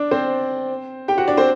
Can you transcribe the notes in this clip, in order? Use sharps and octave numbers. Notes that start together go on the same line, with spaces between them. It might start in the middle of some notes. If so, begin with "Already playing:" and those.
Already playing: D4 D5
C4 C5
G4 G5
F#4 F#5
D4 D5
C4 C5